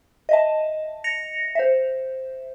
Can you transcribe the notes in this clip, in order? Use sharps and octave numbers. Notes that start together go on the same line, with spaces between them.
D#5 E5 A5
A#6 C#7 F7
C5 E5